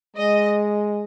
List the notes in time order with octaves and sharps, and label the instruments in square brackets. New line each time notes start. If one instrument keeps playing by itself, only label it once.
[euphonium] G#3 [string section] D#5